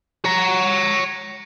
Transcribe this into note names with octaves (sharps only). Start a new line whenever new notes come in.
C#5 A#5